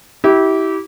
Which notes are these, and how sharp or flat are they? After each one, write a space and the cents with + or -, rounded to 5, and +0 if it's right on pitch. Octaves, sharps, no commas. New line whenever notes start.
E4 -25 G4 -20